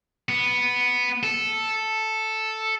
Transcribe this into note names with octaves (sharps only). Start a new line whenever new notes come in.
B3
A4